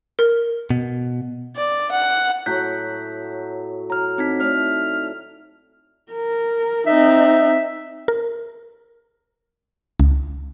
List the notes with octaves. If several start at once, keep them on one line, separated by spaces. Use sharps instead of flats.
A#4
B2
D5
F#5
A2 F#3 A3 F#6 G6 B6
F#3 A#5 F6
C4 D#4 B6
A2 D5 F6
A#4
C4 D#4 E5
A#4
C#2